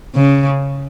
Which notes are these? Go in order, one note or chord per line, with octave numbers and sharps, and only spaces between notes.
C#3